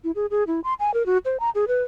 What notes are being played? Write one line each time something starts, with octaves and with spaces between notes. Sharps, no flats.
E4
G#4
G#4
E4
C6
G#5
A#4
F#4
C5
A#5
G#4
B4